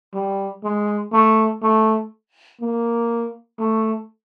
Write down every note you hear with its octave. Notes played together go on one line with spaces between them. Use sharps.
G3
G#3
A3
A3
A#3
A3